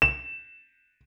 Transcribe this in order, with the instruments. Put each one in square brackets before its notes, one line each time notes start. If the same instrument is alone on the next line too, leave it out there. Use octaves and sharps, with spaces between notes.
[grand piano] E7